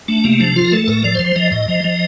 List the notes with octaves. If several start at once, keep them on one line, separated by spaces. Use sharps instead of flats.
A3 D4
C3 A#3
F3 D4
F3 F4
A#4
A3 A4
A4
A2 A#4
F3 D5
C5
F3
C5
F3 D#5
A2 D#5
F3
F3